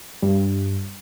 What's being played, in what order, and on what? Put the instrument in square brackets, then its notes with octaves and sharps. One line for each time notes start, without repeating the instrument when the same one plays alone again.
[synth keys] G2